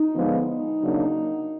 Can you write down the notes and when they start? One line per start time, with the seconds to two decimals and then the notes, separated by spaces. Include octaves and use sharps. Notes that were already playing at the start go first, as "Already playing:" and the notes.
Already playing: D#4
0.13 D3 F3 G#3 B3
0.47 D#4
0.80 C#3 F#3 A#3 D4